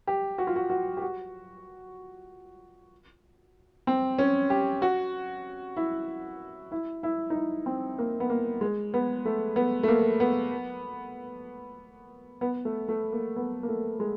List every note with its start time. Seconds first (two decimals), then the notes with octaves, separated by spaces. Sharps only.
0.07 G4
0.38 F#4
0.47 F4
0.56 F#4
0.70 F#4
0.97 G4
1.02 F#4
3.87 C4
4.18 C#4
4.50 G4
4.82 F#4
5.77 E4
6.72 E4
7.03 E4
7.30 D#4
7.35 E4
7.66 C4
7.99 A#3
8.20 B3
8.30 A#3
8.61 G#3
8.94 B3
9.25 A3
9.56 B3
9.83 A3
9.88 A#3
10.20 B3
12.41 B3
12.65 A3
12.88 A3
13.12 A#3
13.36 B3
13.63 A#3
13.68 A3
14.00 G#3